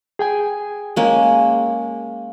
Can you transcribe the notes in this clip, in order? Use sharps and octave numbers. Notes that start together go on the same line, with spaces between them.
G#4 G5 G#5
G#3 A#3 C#4